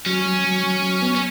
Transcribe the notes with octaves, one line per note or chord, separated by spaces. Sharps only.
F#3 C#4
F#3
F#3
F#3
F#3
B3
C#4